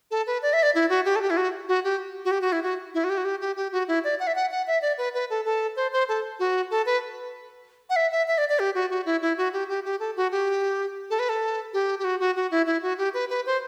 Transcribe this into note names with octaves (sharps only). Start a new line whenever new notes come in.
A4
B4
D5
E5
D5
E4
F#4
G4
A4
G4
E4
F#4
F#4
G4
F#4
G4
F#4
E4
F#4
E4
F#4
G4
F#4
G4
G4
G4
F#4
E4
D5
F#5
E5
F#5
F#5
E5
D5
B4
B4
A4
A4
C5
C5
A4
F#4
A4
B4
F#5
E5
E5
E5
D5
D5
G4
F#4
F#4
E4
E4
F#4
G4
G4
G4
A4
F#4
G4
A4
B4
A4
G4
G4
F#4
F#4
F#4
E4
E4
F#4
G4
B4
B4
C5